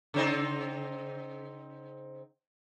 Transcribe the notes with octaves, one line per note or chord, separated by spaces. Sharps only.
C#3 C4 D#4